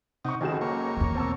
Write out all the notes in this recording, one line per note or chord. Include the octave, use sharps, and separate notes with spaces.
C3 D#4 F#5 C#6
F#1 C#2 D#3 F#4 G#4 A4 E7
A#3 C#5
E2 D#3
B2 C4 A5 E6